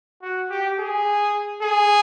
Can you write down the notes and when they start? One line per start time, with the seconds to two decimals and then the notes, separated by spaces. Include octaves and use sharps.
0.22 F#4
0.50 G4
0.79 G#4
1.63 G#4